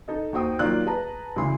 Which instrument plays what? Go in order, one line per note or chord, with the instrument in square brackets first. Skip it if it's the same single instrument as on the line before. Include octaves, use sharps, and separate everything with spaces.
[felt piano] D#4 A4 D#5
D#2 D#4 F#4 C5 G5 D#6
D#3 F#3 A#3 F4 D5 F#6
G#4 B4 A5 A#5
D2 C#3 E3 E4 C6